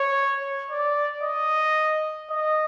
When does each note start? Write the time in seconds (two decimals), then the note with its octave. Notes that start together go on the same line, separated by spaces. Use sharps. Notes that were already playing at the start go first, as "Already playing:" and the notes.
Already playing: C#5
0.71 D5
1.23 D#5
2.30 D#5